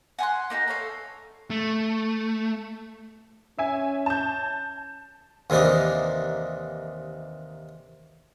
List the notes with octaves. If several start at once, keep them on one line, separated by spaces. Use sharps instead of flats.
F#5 G#5 C6 F#6
A#3 D#4 F4 G4
A4 C#5 F5
A3
C#4 E5 G#5
A5 G6
D#2 C3 E3 D4 D#4